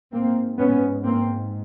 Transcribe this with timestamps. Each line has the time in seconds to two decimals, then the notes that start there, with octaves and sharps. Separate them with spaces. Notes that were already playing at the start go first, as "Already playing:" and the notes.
0.12 G#2 A#3 C4
0.58 B3 C#4
1.05 A#3 C4